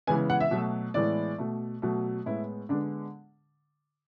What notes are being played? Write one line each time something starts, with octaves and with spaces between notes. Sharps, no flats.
C#3 E3 G#3 B3 G#5
F#5
E5
B2 F#3 A3
A2 E3 G#3 B3 D5
B2 A3
B2 F#3 A3
A2 G#3 B3 E4
D3 G#3 B3 D4